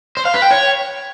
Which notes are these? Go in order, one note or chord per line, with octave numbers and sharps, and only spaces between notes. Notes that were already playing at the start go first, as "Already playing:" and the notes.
C5
F5
B4
G5
C#5